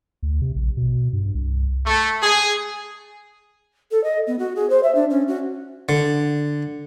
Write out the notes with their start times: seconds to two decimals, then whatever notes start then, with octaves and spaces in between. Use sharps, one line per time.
0.23 D2
0.41 C3
0.56 A#1
0.77 B2
1.13 G2
1.35 C2
1.86 A3
2.22 G#4
3.91 A4
4.04 D#5
4.27 B3
4.39 F#4
4.55 G#4
4.69 C5
4.83 E5
4.95 D4
5.10 C#4
5.28 F#4
5.89 D3